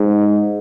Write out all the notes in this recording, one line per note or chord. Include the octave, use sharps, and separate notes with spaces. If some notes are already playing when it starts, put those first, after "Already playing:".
Already playing: G#2